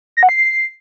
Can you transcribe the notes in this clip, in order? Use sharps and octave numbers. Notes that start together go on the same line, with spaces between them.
A#6
F#5
C7